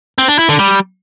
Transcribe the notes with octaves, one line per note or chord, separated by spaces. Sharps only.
C4
D4
E4
D3
G3